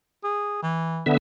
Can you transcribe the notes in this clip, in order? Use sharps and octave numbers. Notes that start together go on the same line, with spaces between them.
G#4
E3
D3 B3 E5